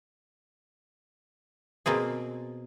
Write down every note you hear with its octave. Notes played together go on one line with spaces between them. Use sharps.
B2 A#3 C4 G#4